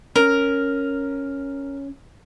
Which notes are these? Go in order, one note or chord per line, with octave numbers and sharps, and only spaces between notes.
C#4 A#4